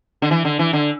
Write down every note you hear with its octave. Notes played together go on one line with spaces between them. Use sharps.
D3
E3
D3
E3
D3